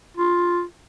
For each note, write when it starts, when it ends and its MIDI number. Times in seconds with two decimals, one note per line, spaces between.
0.17 0.63 65